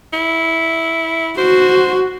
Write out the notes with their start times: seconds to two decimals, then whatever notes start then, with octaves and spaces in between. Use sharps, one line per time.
0.13 E4
1.38 F#4 C5